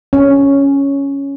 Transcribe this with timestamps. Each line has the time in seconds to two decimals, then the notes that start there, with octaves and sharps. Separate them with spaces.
0.13 C#4